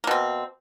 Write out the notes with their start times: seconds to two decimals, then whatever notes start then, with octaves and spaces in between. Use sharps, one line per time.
0.04 A#3
0.07 B2
0.11 C4